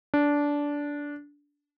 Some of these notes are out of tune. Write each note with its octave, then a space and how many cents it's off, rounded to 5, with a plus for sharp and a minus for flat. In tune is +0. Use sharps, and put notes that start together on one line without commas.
D4 -15